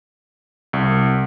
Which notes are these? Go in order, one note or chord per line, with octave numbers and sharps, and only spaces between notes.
C2